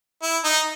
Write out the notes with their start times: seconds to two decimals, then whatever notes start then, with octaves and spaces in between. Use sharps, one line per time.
0.22 E4
0.44 D#4